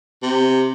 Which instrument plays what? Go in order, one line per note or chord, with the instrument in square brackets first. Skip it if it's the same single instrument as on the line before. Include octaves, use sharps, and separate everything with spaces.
[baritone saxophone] C3